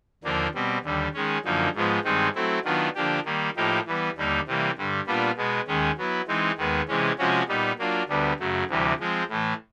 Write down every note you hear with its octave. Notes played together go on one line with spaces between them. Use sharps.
D#2 D3 F3 A#3 D4
B2 G3 C4
D#2 D3 G3
D#3 G#3 C#4
F#2 D3 F3 A#3 D#4
G#2 F3 G#3 B3
G2 D#3 G#3 C4 D#4
F#3 A3 C4 E4
D#3 F#3 B3 D4 F4
D3 F3 A#3 D4 G4
D#3 G3 A#3
A2 F3 A#3 D#4 G4
E3 G3 B3
D#2 D3 G3 A#3 D#4
C3 E3 G3 A#3
G2 D3 G3
A#2 G3 B3 D4 F4
B2 G#3 B3
D#2 D#3 G#3 C#4
F#3 B3 E4
E3 G#3 C4 D#4
D#2 D#3 G#3 B3
C3 E3 G#3 C#4
C3 F3 G#3 C#4 F#4
A#2 G3 B3 D#4
F#3 A#3 D4 F4
D2 D3 G3 B3
F#2 C#3 F#3 A3
D2 C3 E3 G3
F3 G#3 C4
A2 E3 A3